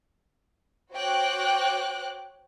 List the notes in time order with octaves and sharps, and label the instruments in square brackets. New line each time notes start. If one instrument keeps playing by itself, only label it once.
[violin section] F#4 C5 C#5 G5 D6 F#6